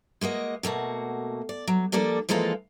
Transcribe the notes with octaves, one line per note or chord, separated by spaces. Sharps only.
G#3 A#3 F#4 D#5
B2 A3 A#3 F#4
D5
F#3
F3 G3 A#3 D4 A4
E3 F3 G#3 A#3 F4 A4